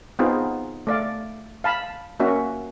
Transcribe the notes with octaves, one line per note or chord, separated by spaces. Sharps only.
B3 C4 D#4 F4 G#4
A3 D5 F5
F5 A5 B5
A#3 C#4 F#4 E5